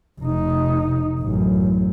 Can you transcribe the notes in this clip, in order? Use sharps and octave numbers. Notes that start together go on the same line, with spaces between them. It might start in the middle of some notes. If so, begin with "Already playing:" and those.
F1 D#4
A1 F#2